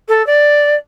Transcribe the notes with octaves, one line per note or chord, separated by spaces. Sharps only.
A4
D5